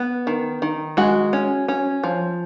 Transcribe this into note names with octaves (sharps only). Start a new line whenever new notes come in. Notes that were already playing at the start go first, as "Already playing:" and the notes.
Already playing: B3
D#3
D#3
G#3 F#4
C#4
C#4
F3